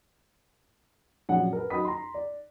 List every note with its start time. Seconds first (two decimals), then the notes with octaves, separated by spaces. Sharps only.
1.29 A#1 F#2 F#5
1.53 A#4 B4
1.70 F#2 D#4 F#4 B5 D#6 B6
1.85 A#5 C6
2.14 D5